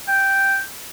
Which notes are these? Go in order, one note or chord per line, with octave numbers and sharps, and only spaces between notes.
G5